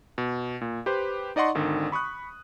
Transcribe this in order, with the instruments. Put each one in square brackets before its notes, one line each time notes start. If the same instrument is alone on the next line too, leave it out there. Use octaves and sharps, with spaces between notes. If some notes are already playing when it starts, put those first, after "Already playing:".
[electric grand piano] B2
A#2
G4 B4 C5
D#4 D5 D#5 F#5 C6 C#6
G#1 D3 D#3
B5 C#6 D#6 F#6